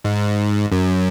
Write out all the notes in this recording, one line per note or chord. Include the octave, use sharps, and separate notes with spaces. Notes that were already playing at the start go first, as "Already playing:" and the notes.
G#2
F#2